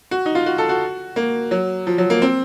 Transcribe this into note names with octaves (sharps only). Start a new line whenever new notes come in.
F#4
D#4
F4
F#4
A4
F#4
A#3
F#3
F3
F#3
A#3
C4